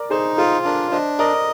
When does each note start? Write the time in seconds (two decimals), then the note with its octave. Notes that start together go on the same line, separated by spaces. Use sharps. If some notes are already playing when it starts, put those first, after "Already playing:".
Already playing: A#4 D5
0.10 D#4 G#4 C5
0.38 F4 G#4 C5
0.65 D4 A#4 D5
0.91 D4 C5 D#5
1.19 A#4 D5 D#5